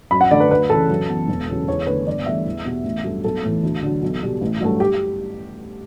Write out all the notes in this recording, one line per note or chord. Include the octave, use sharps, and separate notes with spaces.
F#2 B5
F#5
D3 A3 D5
B4
D2 B4
C#3 E3 A4
F#2
E3 B3
E1
E2 C#3 F#3
E2 C#5
D3 A3 B4
G1 D5
G2 E3 A3 E5
E2
B2 G3 B3
A1
G2 F#3 A3
B1 A4
A2 E3
D2
D3 F#3
B1
B2 G3
A1
G2 F#3 A3
G4